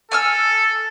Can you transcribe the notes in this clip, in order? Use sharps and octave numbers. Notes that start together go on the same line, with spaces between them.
A4 G#5 E6 F6